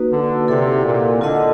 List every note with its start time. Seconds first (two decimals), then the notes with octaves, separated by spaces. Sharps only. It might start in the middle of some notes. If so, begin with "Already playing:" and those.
Already playing: A#3 D#4 F#4 B4
0.12 D3
0.47 C3 E4 A4 D5 F#5
0.85 A#2
1.21 D3 F4 A#4 D#5 F#5